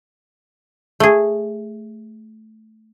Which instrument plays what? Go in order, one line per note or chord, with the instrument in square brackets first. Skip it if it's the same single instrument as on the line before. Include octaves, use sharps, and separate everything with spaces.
[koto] A3 G#4